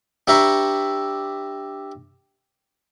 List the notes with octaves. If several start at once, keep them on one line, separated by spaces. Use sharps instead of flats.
D4 G4 B4 E5 A#5 C#6